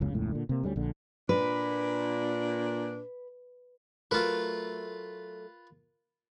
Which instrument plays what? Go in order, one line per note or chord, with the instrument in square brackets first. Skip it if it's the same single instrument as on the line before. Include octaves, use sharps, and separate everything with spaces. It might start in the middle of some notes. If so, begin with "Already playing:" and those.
[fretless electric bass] F#1 C#2 C#3
E1 C#2 A2
A#2 D3
C3 A#3
D2 G3 G#3 C#4
A#1 D3
[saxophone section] A#2 D4 [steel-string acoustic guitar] B4
[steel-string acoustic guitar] F#3 A3 [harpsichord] F4 B4 [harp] A#4 F6